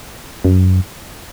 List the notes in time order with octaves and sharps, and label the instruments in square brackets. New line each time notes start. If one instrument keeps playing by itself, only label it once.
[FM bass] F#2